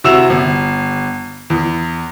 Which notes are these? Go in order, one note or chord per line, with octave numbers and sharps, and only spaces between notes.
C3 E4 F#4 E6 E7 F7
G1
E2